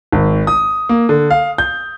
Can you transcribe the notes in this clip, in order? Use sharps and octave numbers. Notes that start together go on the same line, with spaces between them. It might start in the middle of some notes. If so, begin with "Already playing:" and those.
G#1
D#6
A#3
D3
F5
G6